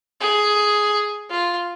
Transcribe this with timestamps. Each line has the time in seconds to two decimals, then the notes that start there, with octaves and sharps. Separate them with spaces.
0.21 G#4
1.30 F4